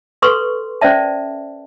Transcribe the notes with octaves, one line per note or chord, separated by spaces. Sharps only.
A4 B4 C6 C#6
C#4 C5 D5 E5 A5